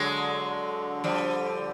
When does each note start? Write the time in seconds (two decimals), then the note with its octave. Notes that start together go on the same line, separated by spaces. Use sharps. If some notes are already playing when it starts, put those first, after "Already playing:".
Already playing: D3 F#3 G#3
1.04 F3 G3